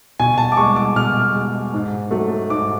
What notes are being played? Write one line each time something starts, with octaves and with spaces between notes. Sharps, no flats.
B2 G#5
A5
D6
G#3 C#6
D6
B2 F6
G#3
G#2
F#3 A3
G#2 D6